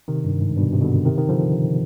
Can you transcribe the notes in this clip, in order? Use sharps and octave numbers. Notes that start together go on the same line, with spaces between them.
C3 D#3
G2
G#2
G2 B2
C3
B2 D3
C3 D#3
D#3
D3 F3